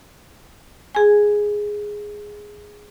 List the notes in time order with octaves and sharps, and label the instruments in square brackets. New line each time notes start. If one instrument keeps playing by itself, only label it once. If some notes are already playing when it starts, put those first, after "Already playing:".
[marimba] G#4 G#5